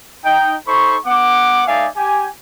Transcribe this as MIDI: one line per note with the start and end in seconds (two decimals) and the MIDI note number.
0.25 0.54 63
0.25 0.54 79
0.67 0.97 63
0.67 0.97 69
0.67 0.97 72
0.67 0.97 83
0.67 0.97 85
1.06 1.62 59
1.06 1.62 78
1.06 1.62 86
1.68 1.88 57
1.68 1.88 63
1.68 1.88 74
1.68 1.88 76
1.68 1.88 77
1.68 1.88 80
1.97 2.28 67
1.97 2.28 80